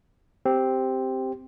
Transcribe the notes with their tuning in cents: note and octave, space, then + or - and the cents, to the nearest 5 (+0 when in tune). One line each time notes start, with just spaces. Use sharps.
C4 +0 G4 +0